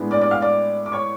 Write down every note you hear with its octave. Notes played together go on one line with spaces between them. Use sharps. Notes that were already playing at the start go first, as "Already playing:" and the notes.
Already playing: A2 G#3 B3 D4
D5 D6
D5 D6
F5 F6
D5 D6
D6
C#5 C#6